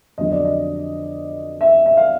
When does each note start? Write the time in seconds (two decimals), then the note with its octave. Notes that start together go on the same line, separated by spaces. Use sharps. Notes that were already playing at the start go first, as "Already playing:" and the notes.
0.18 F2 D3 F#3 D#5
0.32 D5
0.45 D#5
1.61 E5
1.86 E5
1.97 F5